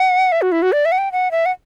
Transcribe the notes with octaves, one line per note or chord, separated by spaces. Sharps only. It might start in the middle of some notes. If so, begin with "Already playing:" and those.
Already playing: F#5
E5
F#4
E4
F#4
D5
E5
F#5
G5
F#5
E5
F#5